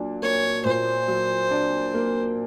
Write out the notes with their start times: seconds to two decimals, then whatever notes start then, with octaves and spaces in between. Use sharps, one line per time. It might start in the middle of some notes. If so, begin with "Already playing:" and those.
Already playing: A#2 F#3 D4
0.22 A#3 C#5
0.65 A#2 C5
1.08 F#3
1.51 D4
1.94 A#3